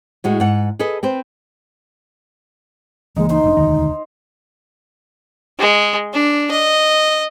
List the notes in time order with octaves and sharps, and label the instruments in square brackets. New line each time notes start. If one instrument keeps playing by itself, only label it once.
[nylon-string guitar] A2 G#3 F#4
G#2 F#5
G#4 A4 B4 D#5
C4 B4 C5
[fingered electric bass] C#2 E3 A#3 [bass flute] G#3 [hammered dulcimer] D#4
[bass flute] D#4 [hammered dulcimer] C5
[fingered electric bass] F1 A#2 D4
[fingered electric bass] E1 D2 D#3 [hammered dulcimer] A#5
[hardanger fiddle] G#3
D4
D#5